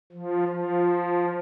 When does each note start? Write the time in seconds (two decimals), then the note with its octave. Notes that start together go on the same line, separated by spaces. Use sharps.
0.12 F3
0.48 F3